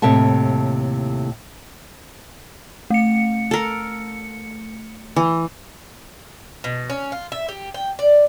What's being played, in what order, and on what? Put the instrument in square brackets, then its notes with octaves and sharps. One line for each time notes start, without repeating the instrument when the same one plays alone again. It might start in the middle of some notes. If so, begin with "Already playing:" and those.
[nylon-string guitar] D#2 A2 C3 A4 E5 A5
[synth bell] A3 C#7
[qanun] A4 A#4
E3
[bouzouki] B2
C#4
F4
E5
G4
G5
D5